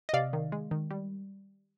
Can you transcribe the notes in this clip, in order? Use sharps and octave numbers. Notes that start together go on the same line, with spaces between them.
D#5
C3 D5 F5
D#3
G#3
D#3
G3